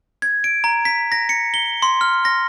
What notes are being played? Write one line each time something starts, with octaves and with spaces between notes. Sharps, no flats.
G#6
D7
A#5
B6
A#6
C#7
G7
C6
F6
A#6